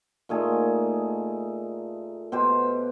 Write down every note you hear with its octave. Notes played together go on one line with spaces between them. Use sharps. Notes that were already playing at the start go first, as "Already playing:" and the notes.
A#2 A3 D#4 G#4
B2 G4 C5